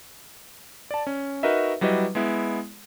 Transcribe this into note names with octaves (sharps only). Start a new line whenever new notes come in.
D5 A5
C#4
D#4 F#4 A#4 B4 D#5 E5
F#3 G3 E4 B4 D#5
G#3 B3 E4